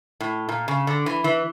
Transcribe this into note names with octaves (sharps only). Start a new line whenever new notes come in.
A2
A#2
C#3
D3
E3
E3